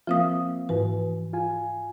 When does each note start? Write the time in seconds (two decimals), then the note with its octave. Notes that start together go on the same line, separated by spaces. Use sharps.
0.07 F3 A#3 C4 F4 F5 D#6
0.69 G#2 E3 B4
1.33 F4 G#5